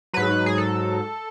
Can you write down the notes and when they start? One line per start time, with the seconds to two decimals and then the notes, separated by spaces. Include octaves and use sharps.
0.14 G#2 F#3 B4
0.46 G#4
0.58 A4